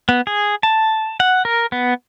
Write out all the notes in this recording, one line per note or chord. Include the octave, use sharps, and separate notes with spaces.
B3
G#4
A5
F#5
A#4
B3